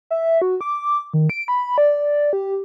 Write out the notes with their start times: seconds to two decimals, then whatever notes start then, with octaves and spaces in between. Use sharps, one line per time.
0.11 E5
0.42 F#4
0.61 D6
1.14 D#3
1.30 D7
1.48 B5
1.78 D5
2.33 G4